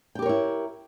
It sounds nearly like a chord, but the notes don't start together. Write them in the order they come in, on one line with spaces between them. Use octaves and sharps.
G5 G4 A#4 C#5 E4